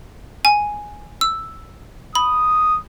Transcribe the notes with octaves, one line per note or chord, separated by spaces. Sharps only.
G#5
E6
B5 D#6